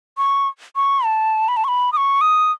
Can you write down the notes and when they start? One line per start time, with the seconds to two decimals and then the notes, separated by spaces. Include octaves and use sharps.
0.18 C#6
0.76 C#6
1.05 A5
1.48 B5
1.57 A5
1.64 C#6
1.68 B5
1.93 D#6
1.97 C#6
2.21 D#6